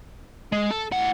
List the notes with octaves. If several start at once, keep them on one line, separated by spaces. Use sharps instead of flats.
G#3
A4
A2 F#5